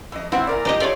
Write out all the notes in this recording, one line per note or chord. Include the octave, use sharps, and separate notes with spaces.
F2 D#5
C4 E4 F#5
A#2 A#4 D5
D#4 G4 D#5
A3 F4 C#5 D5